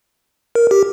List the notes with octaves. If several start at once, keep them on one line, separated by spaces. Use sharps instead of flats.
A#4
G4